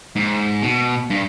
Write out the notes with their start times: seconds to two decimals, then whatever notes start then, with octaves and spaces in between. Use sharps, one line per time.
0.16 G#2
0.63 B2
1.10 G2